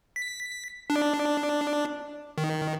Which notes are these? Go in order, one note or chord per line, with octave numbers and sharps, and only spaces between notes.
B6
D4
D#3